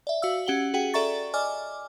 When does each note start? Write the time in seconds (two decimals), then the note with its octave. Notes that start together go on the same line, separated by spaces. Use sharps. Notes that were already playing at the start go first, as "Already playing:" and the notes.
0.07 D5 E5
0.22 F#4 F5 E6
0.46 C#4 G4 F#5 F#7 G7
0.74 F#4 G#4 F#5 G5
0.94 A4 D5 E5 A#5 C#6 A6
1.34 D5 D#5 G#5 D6 F6